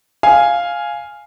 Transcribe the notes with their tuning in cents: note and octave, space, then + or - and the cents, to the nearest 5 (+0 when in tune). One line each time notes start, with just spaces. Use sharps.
F5 +0 G#5 +0